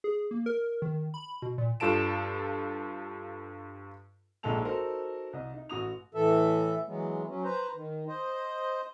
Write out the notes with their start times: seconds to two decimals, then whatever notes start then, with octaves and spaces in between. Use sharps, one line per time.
0.04 G#4
0.31 A#3
0.46 A#4
0.82 D#3
1.14 B5
1.42 B2
1.58 A#2
1.80 G2 F4 A4 A5 D7 E7
4.43 A#1 G#2 G#3 C4 A4 F7
4.65 D#4 F#4 A4 A#4 C5
5.33 C2 D#5
5.54 D#4
5.69 A1 F#4 D#6 F7
6.15 A2 E3 A4 E5
6.87 E3 F#3 G#3 B3
7.27 F#3 C#4
7.44 B4 C5 A#5
7.75 D#3
8.08 C5 D#5